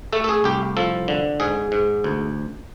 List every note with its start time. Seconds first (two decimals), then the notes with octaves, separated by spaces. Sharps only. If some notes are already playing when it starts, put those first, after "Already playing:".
0.13 A3 A4
0.24 A4
0.29 G#4
0.44 C2 G4
0.77 F3 A4
1.08 D3
1.40 G#2 G#4
1.72 G#2
2.04 D2